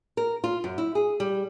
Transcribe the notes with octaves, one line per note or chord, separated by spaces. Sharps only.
A#4
F4
F#2
E4
G#4
G3